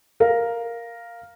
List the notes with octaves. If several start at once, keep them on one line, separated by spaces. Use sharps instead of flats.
A#4 F5